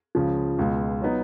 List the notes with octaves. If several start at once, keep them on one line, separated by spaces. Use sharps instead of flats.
C#2 C#3 F3
C#2 B2 G#3
F#3 B3 D#4